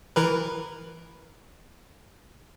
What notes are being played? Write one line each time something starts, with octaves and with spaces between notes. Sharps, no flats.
E3 A#4 B4